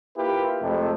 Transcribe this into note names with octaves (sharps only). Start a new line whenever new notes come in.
A#3 E4 F4 G4 B4
F2 C3 G#3 A3